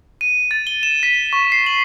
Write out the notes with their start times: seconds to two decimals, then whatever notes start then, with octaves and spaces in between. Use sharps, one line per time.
0.21 D#7
0.51 A6
0.67 G7
0.83 E7
1.03 B6
1.33 C#6
1.52 C7
1.66 F#7